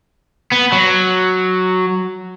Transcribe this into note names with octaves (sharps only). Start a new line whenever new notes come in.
B3
F#3